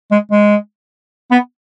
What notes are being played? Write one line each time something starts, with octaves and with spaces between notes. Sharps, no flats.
G#3
G#3
B3